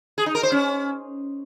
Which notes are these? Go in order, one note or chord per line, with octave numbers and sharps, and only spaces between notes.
G#4
D#4
A#4
C5
C#4